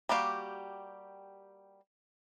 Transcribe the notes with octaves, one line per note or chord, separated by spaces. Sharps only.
G3 A#3 F#4 G4 F5